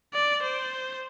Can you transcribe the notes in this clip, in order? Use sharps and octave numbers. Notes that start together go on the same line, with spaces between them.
D5
C5